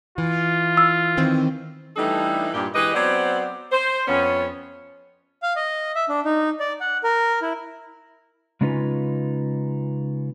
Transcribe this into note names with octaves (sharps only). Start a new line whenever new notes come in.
E3 F4
E6
D#3 E3 C4
E3 G3 A3 D4 D#4 A4
G2 A#2 G4
E3 G#3 G4 B4 D#5
F#3 B3 C4 C5 D5
C5
F2 B3 C#4
F5
D#5
E5
D4
D#4
D5
F#5
A#4
E4
C#3 G#3 C#4 D#4 F4 B4